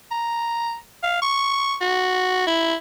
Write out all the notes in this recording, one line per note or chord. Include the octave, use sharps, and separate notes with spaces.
A#5
F5
C#6
F#4
E4